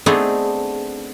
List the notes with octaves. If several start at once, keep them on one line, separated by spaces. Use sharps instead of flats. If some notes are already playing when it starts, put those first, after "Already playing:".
A3 B3 C4 D4 D#4 G#4